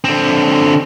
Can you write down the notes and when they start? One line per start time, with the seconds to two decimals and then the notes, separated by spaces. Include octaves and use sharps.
0.04 D3 C4